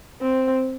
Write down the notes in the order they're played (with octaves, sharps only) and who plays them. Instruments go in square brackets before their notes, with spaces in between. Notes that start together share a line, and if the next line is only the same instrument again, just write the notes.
[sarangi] C4